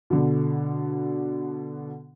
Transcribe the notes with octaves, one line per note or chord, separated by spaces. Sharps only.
B2 D3